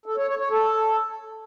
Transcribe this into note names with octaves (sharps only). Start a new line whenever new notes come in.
A4
C#5
C#5
C#5
A4